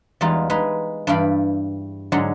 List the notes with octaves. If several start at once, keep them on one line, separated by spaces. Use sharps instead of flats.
E2 G3 G#3 D#4 F4
G#3 D#4 B4
G2 E3 D5 F5 G5 B5
G#2 D3 F#3 G#3